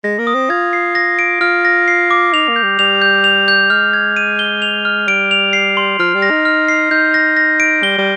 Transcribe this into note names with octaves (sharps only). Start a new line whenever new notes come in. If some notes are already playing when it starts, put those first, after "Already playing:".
G#3 A#6
A#3
D#6
C4
F4 G#6
C7
A#6
D7
F4 F6
A#6
C7
D6
D#4 F7
A#3
G6
G3
G3 F7
G6
F7
G6
G#3 F6
G#6
D#7
G7
F7
F6
G3 D7
F7
C7
C6
F3 F6
G3
A#6
D#4
F6
C7
D#4 G6
A#6
A#6
D7
G3 G7
G3